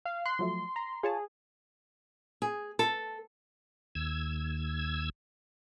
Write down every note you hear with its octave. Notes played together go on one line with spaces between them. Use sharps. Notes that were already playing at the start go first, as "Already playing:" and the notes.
F5
C6 F#6
F3 F#3 A3
A#5
F4 G#4 C#5 A5
G#4
A4
D#2 E6 G#6